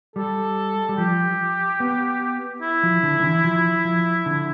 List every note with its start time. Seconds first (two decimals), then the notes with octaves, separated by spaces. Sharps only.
0.16 G3 A4
0.89 G3
0.97 F3 G4
1.80 B3
2.62 E4
2.83 F3
3.03 D3
3.20 D3
3.24 E3
3.45 F3
3.85 F3
4.26 D3